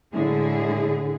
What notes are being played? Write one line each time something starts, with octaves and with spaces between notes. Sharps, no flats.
A2 D3 G#3 E4 G#4